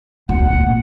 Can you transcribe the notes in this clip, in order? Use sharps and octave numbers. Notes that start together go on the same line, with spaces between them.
D1 F#5
A#2